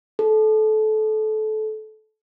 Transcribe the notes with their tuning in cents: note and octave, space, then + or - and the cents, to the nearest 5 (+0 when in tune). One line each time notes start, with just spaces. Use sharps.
A4 -25